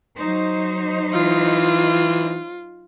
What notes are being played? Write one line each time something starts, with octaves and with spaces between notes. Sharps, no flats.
F#3 D#4 C5
E3 F4